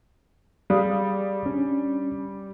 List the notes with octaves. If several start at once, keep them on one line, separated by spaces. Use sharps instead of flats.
G3 G#4 F5 D#6
C#4 D4